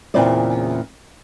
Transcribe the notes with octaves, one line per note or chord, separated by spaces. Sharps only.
E2 A#2 C#3 C4 E4 D5